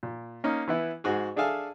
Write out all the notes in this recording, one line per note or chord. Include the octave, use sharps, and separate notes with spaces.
A#2
A#3 C#4 D#4
E3 B3 E4
G#2 F#4 G#4
D4 G#4 A4 E5 F5 G#5